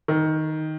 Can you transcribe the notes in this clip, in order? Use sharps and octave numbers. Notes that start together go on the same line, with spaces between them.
D#3